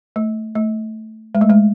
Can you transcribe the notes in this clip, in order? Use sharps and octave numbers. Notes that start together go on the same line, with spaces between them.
A3
A3
G#3
A3
G#3